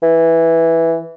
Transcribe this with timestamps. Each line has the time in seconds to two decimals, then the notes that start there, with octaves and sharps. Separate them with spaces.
0.03 E3